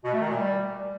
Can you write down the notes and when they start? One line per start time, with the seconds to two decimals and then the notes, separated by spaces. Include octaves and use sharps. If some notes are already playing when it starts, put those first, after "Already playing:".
0.04 B2
0.12 A3
0.20 D#3
0.28 A#2
0.36 G3